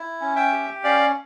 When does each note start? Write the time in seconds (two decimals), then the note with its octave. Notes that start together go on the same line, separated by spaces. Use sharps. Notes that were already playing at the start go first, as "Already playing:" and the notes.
Already playing: E4
0.21 C#4
0.36 E5 G5
0.52 G4
0.83 C#4 D5 F5